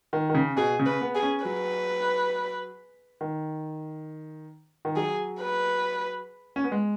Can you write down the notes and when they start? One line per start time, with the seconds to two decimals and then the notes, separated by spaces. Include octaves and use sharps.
0.13 D#3
0.30 D#3
0.35 C#3
0.56 B2 G#4
0.79 C#3
0.86 B4
1.01 B3
1.15 G#4
1.23 C#4
1.45 F#3 B4
3.21 D#3
4.85 D#3
4.96 F#3 G#4
5.40 B4
6.56 C#4
6.64 B3
6.72 G#3